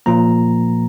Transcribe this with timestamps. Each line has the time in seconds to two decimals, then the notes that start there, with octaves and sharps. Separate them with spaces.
0.06 A#2 F3 A#3 A#5